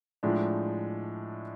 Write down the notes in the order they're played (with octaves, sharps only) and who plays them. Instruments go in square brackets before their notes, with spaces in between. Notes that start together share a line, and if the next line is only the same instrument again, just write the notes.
[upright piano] A2 F3 G#3 D4